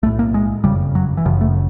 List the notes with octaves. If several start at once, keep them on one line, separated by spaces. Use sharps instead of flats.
B1 A2 A3
A#3
G#3
F#1 F2 C#3 G3
F#3
E3
G1 F#2 C#3 F3
A3